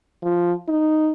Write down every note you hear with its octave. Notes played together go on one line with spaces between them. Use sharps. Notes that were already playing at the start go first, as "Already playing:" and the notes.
F3
D#4